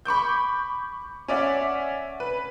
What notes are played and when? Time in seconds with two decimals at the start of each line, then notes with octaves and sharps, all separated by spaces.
0.05 B5 C#6 D6 G6
1.28 C#4 D5 E5 F#5
2.20 B4